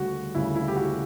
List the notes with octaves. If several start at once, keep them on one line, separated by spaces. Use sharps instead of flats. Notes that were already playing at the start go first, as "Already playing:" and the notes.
Already playing: D2 C#3 G3 F#4
D2 C#3 G3 E4
E4
G4
F#4